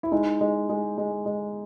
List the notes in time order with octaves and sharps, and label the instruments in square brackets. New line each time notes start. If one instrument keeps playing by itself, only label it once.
[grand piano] E4
[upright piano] G#3 [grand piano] D#4
[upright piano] G#3
G#3
G#3
G#3